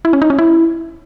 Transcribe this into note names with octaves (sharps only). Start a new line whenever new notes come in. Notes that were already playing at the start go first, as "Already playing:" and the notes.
E4
C#4
D#4
C#4
E4